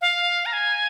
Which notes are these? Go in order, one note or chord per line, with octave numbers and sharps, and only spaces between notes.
F5
A#5
G#5